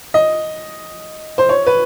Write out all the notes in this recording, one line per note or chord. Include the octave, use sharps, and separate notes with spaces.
D#5
C5
C#5
B4